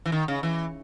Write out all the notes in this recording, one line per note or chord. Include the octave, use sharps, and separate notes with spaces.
E3
D#3
C#3
E3